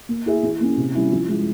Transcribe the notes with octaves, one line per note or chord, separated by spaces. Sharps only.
A#3
E4 G#4 E5
E3
A#3 C#4
C3
G3 C#4 E4
F3
G#3 E4